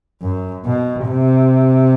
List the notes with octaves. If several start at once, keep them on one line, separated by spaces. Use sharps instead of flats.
F#2
B2
C3